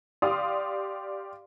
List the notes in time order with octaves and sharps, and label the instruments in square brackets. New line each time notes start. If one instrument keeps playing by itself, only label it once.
[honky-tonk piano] G4 D5 F5 C6 D#6